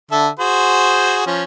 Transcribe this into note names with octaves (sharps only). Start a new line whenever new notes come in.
D3 A4 E5
F#4 G#4 C5
F3 C#4